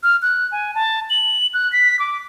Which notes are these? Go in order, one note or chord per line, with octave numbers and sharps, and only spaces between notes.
F6
F#6
G#5
A5
F#7
F#6
B6
D6